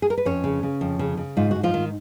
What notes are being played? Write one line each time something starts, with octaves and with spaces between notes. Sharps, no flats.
G#4
A#4
B4
F2 C#4 C#5
C#3
C#3
F2
C#3
C#3
G#2 F4
G#2 F#4
F3 F4
D#3